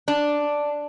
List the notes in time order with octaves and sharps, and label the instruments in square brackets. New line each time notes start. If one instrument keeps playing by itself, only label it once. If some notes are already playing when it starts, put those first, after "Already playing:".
[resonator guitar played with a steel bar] D4